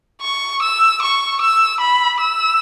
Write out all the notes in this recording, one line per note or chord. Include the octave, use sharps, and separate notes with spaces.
C#6
E6
C#6
E6
B5
E6